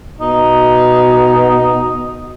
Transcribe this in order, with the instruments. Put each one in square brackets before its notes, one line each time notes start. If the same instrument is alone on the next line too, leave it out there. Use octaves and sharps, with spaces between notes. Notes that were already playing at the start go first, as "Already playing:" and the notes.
[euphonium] B2 [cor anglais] D#4